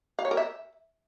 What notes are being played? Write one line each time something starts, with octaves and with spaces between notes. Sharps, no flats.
F5
C#5
A#4
E5